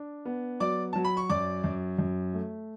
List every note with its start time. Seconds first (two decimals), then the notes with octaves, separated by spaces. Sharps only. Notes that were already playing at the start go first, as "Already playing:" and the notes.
Already playing: D4
0.25 B3
0.60 F#3 D5 D6
0.93 F#3 A5
1.05 B5
1.17 C#6
1.30 F#2 D5 D6
1.64 F#2
1.99 F#2
2.33 A3